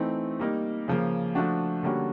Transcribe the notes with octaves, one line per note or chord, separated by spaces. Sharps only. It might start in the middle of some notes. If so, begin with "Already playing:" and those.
Already playing: E3 A3 C4 D#4
G3 A#3 D#4
C#3 F3 A#3
F3 A3 D4 F#4
D3 G3 A#3 C#4 F#4